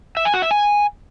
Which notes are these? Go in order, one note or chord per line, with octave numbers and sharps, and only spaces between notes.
E5
G#5
F#4
E5
G#5